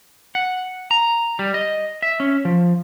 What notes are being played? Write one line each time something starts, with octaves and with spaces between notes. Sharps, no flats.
F#5
A#5
G3
D#5
E5
C#4
F3